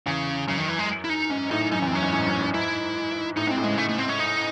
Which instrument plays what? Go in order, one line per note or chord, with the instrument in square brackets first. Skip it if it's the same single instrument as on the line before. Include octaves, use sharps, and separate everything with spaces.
[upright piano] E2 [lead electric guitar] C#3
[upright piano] F#2 [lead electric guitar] C#3
[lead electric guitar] D#3
E3
G#3
E4
D#4
[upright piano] G#2 [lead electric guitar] C#4
[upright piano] A2 [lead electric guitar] D#4
[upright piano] F#2 [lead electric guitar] D#4
[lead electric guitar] C#4
[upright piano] E2
[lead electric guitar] C4
[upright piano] F#2 [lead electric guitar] C#4
[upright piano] G#2
A2
F#2
G#2
[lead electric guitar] E4
[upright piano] A2 [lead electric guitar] D#4
[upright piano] G#2 [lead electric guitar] C4
[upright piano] A2
[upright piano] C#3 [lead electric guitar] G#3
[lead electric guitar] A3
A3
C4
C#4
D#4